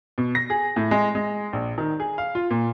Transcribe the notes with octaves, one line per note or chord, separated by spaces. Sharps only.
B2
A#6
G#4
A2
G#3
G#3
A#1
D#3
G#4
F5
F4
A#2